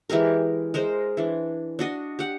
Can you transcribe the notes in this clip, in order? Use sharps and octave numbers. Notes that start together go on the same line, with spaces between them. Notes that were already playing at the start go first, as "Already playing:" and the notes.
E3 G#3 G4 A#4
G#3 A#4 C5 D#5
E3 D4
D4 F#4 D#5
G4 F#5